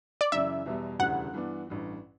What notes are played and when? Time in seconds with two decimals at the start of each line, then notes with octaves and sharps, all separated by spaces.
0.21 D5
0.32 F#2 C#3 E3 E5
0.66 E2 B2 G3
0.99 E1 D2 C#3 E3 G3 F#5
1.33 G2 E3 B3 D4
1.67 A1 G2 E3